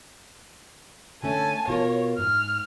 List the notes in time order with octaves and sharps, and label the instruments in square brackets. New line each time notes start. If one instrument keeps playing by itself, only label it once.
[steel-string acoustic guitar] D3 A3 C#4 [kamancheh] G#5 A5
[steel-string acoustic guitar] B2 F4 A#4 [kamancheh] C#5
[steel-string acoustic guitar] G#2 [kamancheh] F6